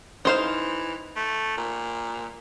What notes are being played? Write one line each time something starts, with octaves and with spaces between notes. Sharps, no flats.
E3 D#4 C5 F5
A3
A#2